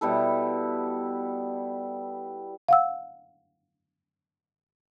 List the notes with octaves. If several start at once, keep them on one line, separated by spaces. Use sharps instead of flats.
B2 G3 E4 A4
F5 F#5 E6